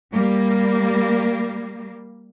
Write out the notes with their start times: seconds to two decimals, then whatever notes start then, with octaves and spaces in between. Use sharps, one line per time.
0.13 G3 A#3